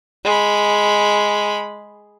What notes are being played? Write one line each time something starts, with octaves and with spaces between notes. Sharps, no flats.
G#3 B5